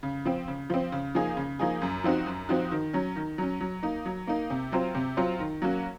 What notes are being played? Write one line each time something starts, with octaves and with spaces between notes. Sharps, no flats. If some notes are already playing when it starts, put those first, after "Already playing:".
C#3
F3 C4
C#3
F3 C4
C#3
F3 A#3 D#4 G#4
C#3
F3 A#3 D#4 G#4
F#2
F3 C4 D#4 F#4
F#2
F3 C4 D#4 F#4
D#3
F#3 C#4
D#3
F#3 C#4
F#3
A#3 D#4
F#3
A#3 D#4
C3
F#3 C4 F4 C5
C3
F#3 C4 F4 C5
D#3
F#3 A#3 C#4 F#4